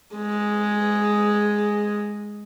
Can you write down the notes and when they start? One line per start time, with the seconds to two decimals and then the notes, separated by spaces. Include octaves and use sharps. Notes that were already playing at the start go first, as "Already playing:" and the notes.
0.15 G#3 G#4